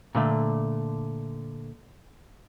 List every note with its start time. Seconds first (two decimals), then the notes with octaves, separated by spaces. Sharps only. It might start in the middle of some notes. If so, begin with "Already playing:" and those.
0.15 A#2 D3 A3